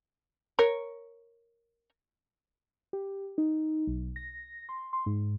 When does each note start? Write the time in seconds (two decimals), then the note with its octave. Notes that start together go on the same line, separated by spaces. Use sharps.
0.59 A#4 C#5
2.93 G4
3.38 D#4
3.87 B1
4.16 A#6
4.69 C6
4.93 C6
5.06 G#2